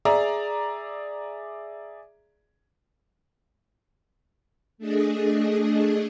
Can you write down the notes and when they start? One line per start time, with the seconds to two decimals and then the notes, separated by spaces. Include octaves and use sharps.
0.05 G#4 D5 E5 A#5
4.78 A3 D4 G#4 D#5